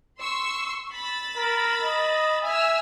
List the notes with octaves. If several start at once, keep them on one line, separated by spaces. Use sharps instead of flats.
C6 C#6 E6
B5 E6 A6
A#4
D#5
E5 G#5 E6 F6